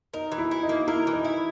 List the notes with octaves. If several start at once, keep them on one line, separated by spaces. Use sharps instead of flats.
D#4 A#4
E3
E4
E4
D#4
A#3
E4 A#4
E3
D#4
E4